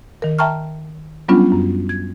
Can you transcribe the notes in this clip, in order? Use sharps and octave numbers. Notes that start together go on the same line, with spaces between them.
D#3 A#4
E5 G5 A5 A#5 C#6 F6
F#3 G3 B3 C#4 D4 F4
F#2
G#6